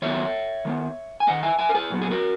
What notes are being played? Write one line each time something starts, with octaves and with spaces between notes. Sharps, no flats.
D#3 F#3 B3 C#5 E5
D#3 G#3 B3
G#5
D#3 A#3 D#5 F#5
E5 G#5
E5 G#5
A#4
G#4 B4
A#2 F#3 B3
G#4
F#4 A#4